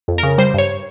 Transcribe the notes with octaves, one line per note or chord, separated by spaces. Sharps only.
F2
C#3 A#4
G3 C5
G2 C#5